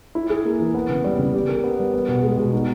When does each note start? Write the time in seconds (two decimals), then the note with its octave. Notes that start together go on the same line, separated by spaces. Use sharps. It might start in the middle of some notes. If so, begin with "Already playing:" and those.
0.15 E4
0.30 G#4
0.45 A#3
0.60 E3
0.74 B3
0.89 C#3
1.04 G3
1.19 C#3
1.34 G4
1.49 A#4
1.64 B3
1.78 G3
1.94 B3
2.08 B2
2.23 G#3
2.38 B2
2.52 D#4